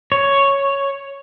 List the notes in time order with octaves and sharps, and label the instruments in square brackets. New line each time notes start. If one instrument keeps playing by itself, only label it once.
[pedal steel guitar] C#5